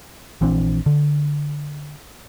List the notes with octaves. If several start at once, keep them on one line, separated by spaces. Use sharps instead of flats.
A#1 E3 C4 D4
D3